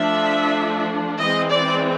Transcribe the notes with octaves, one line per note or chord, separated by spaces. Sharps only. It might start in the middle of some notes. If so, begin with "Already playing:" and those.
Already playing: F3 A3 D4 E5
E3 G#3 C4 D#5
D5